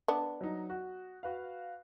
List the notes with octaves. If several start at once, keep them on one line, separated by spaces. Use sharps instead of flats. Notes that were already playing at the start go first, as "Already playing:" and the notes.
B3 D4
F#3 D#4
F#4
F#4 B4 F5